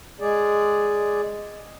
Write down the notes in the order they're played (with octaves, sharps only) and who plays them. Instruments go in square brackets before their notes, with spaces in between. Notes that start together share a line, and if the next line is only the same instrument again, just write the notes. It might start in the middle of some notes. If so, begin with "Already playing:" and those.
[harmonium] G#3 G#4 D5